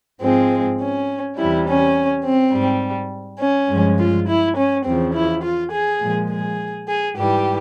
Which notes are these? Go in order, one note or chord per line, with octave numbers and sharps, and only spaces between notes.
G#2 F3 G#3 C4
C#4
E2 C3 G3 E4
C#4
C4
G#2 G3
C#4
G2 F3 G#3
F4
E4
C#4
E2 C#3 F3 C4
E4
F4
G#4
A#2 F3 G#3
G#4
G#4
G#2 E3 G3 G4